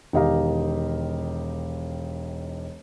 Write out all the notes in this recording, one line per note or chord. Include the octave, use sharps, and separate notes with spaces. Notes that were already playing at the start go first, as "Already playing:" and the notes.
E1 D#3 G4 D#5 F5 A#5